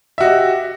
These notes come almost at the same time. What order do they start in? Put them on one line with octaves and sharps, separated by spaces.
E5 F#4 D#5 G4